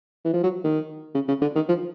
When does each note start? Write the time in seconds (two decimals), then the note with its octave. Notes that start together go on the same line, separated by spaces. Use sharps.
0.25 E3
0.33 F3
0.43 F#3
0.64 D#3
1.15 C#3
1.28 C#3
1.41 D3
1.55 D#3
1.68 F3